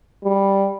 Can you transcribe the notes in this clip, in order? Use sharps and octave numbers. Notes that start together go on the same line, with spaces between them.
G3